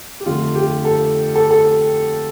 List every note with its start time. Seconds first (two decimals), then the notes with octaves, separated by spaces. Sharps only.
0.20 G4
0.26 F2 D3 A3 F4
0.55 G4
0.85 A4
1.36 A4
1.51 A4